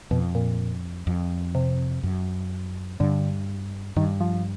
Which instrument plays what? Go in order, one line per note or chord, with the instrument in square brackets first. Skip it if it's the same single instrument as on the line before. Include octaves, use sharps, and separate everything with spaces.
[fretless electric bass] F2 [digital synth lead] B2
[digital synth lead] A#2
[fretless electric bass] F2
[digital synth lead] C3
[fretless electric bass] F#2
[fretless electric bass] G2 [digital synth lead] D3
[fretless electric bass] G2 [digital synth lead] D#3
[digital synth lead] F3